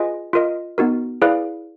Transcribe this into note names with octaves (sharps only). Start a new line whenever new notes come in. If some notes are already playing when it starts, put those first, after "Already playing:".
Already playing: F4 G#4 B4 D#5 G#5
F4 A#4 D#5
B3 D#4 F#4 A#4
E4 G#4 B4 D5 F5